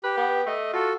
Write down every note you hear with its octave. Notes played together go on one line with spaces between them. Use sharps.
G4 B4
B3
A3 D#5
F4 F#4 A4